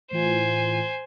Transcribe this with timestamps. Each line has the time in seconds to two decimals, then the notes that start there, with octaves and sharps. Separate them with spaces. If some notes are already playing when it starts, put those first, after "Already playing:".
0.11 A2 E3 F4 C5 G#5